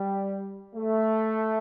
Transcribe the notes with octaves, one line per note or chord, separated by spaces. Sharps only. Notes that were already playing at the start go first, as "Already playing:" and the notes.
Already playing: G3
A3